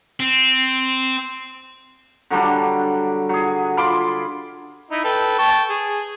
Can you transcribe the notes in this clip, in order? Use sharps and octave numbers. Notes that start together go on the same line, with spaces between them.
C4
D3 F#3 G3 D4
F#3 G#4
F4 B5 C6 D6
D#4 E4
A4 B4 G5
G5 A5 C#6
G#4